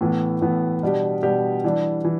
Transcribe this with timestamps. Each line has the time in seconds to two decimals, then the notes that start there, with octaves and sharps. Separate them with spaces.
0.01 A2 E3 B3
0.41 A2 E3 B3
0.83 B2 G3 D4 G4
1.23 B2 G3 D4 G4
1.64 E3 G3 D4
2.05 E3